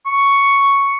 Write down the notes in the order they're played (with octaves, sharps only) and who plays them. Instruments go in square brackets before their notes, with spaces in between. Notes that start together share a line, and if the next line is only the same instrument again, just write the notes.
[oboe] C#6